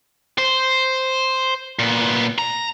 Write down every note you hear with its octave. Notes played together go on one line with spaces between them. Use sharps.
C5
A#2 B3
A#5